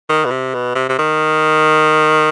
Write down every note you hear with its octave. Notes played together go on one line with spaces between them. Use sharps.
D#3
B2
C3
B2
C3
C3
D#3